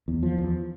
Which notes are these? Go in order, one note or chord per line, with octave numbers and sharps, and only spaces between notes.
E2
F3
E2